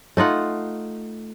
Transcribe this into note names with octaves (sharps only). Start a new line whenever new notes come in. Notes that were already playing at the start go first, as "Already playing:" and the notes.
A3 D#4 F4 F#5